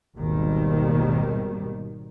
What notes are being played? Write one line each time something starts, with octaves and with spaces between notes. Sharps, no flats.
G#1 D#2 B2 D#3 G3